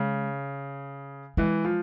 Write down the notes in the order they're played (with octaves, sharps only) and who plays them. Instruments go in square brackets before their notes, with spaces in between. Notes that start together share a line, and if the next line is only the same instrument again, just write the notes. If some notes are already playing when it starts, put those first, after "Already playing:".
Already playing: [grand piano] C#3 [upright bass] G#3
[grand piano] E3 [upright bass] G#3
[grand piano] F3